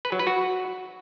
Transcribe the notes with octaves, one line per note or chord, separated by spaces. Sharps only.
B4
F#3
B4
F#4